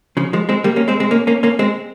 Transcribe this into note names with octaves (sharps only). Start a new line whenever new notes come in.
C#3 F3
F3 G#3
G#3 C4
G3 A#3
A#3 C#4
G#3 C4
G#3 C4
A#3 C#4
A#3 C#4
A#3 C#4
G#3 C4